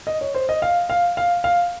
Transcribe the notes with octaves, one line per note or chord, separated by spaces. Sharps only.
D#5
C#5
C5
D#5
F5
F5
F5
F5